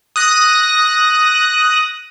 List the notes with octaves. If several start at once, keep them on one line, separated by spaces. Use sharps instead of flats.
D#6 F#6 A#6